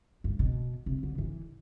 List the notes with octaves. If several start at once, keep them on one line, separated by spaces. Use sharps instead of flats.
G2
B2
C3
D3
E3